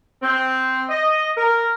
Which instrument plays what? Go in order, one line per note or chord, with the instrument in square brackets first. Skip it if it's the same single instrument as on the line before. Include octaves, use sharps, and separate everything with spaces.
[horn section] C4
D#5
A#4